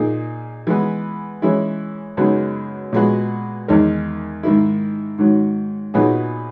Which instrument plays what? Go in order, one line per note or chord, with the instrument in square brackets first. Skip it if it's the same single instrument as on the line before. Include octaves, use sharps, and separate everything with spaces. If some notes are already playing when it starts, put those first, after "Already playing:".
Already playing: [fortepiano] A#2 A#3 D#4 G#4
E3 G#3 B3
E3 G#3 C#4 E4
F#2 C#3 G#3 B3 D#4
A#2 G#3 B3 F#4
E2 D#3 G#3 D#4 A#4
G#2 D#3 A#3 E4
G#2 D#3 F#3
A#2 F#3 B3 D#4 G#4